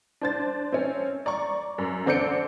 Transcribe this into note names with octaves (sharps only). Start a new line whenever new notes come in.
D4 C5 A6
C4 C#4
D5 A#5 C#6
F#2
D3 C4 D5 G6 C#7 D7